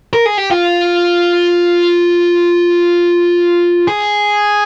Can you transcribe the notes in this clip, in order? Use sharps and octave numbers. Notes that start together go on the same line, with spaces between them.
A#4
G#4
G4
F4
G#4